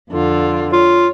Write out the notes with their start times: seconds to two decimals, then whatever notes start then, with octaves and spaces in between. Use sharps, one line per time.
0.10 F2 D3 F4
0.73 F4 C#5